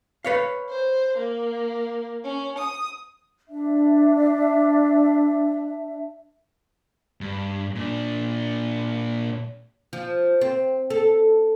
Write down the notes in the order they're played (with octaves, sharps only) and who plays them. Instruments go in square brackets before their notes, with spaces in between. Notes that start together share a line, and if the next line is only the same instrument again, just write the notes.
[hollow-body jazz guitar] B4 C#5 F5
[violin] C5
A#3
C#4
D#6
[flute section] D4 E5
[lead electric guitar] G2
A#2 D4
[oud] F3
C4
A4